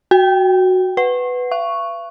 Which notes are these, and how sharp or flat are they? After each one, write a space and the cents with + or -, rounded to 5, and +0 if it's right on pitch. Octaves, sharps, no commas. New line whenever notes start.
F#4 +0 G5 +0
B4 +10 F#5 +0
F5 -45 C#6 +0